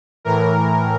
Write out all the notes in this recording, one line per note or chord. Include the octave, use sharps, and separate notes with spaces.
A2 E3 A#4